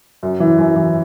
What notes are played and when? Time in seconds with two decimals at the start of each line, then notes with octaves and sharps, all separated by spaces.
0.23 F#2
0.40 E3
0.58 F#2
0.76 E3